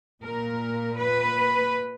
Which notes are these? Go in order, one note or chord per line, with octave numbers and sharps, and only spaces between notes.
A#2 A#4
B4